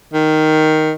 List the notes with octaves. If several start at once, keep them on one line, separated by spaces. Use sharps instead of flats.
D#3